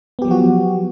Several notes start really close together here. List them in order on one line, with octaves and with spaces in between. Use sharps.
B3 G4 F#3 F3 F#4